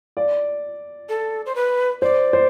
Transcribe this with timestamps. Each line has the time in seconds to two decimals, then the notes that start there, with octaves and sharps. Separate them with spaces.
0.17 D5
1.09 A4
1.46 C5
1.55 B4
2.02 C5 D5
2.33 C5